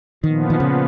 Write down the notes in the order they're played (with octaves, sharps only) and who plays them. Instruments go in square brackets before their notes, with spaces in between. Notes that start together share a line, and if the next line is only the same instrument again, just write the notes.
[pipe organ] A#2 F3 B3 [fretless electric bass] D#3
[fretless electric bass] D#3
C#3